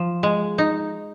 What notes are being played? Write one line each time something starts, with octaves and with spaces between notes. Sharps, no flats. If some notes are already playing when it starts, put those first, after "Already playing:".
Already playing: F3
G#3
D#4